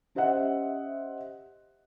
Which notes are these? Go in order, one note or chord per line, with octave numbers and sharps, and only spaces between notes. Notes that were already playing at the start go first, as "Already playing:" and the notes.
C#4 G4 C5 D#5 E5 F#5